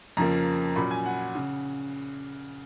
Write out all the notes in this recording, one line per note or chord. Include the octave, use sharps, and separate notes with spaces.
F2 C#3 F3 A#3 A#5
A#2 F#3 C#4 B5
G#5
F#5
C#3